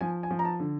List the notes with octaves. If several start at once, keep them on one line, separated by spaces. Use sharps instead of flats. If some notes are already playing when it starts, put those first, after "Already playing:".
F3 G#5
G#5
F3
A#5
A5
D3